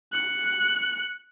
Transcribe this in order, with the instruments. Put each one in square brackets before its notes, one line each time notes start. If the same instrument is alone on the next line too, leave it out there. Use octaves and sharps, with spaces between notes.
[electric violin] F#6 C#7